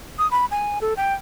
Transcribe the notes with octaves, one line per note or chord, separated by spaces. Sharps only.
D#6
B5
G#5
A4
G5